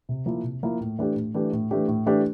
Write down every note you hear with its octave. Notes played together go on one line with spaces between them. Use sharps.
C3
F3 A#3 E4
C3
F3 A#3 E4
A2
E3 A3 D4 G4
A2
E3 A3 D4 G4
A2
E3 A3 D4 G4
A2
E3 A3 D4 G4